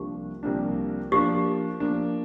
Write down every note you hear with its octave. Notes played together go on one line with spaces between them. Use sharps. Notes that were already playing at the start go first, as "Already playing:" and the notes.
Already playing: C2 C3 F3 A#3 D4 G4
C2 C3 F3 A#3 D4
F3 A#3 D4 G4
F3 A#3 D4